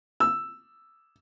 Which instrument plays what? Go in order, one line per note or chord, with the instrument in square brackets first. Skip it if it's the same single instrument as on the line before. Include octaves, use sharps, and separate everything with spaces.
[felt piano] E6